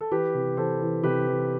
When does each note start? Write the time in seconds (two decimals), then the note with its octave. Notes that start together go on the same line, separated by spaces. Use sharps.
0.01 A4
0.11 E3 G4 B4
0.34 C3
0.57 E3 A4 C5
0.81 E3
1.03 C3 G4 B4
1.27 E3